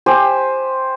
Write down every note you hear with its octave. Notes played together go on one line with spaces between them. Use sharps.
G4 C5 G#5